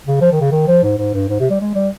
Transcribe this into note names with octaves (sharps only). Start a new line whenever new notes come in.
C#3
F3
D#3
C#3
D#3
F3
G#2
G#2
G2
G#2
C3
G3
G#3
G3